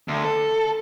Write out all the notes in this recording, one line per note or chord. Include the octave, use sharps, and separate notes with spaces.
D2
A4